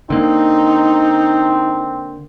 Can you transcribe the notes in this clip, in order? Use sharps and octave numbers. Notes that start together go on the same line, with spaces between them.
D3 A#3 C4 D#4